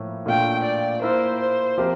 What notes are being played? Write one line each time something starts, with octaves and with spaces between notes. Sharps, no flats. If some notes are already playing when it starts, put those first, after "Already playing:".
Already playing: A2 F3 A#3 E4
A#2 A3 D4 F4 G5
D5
A#3 E4 A#4 C5
C5
F3 C4 G4 A#4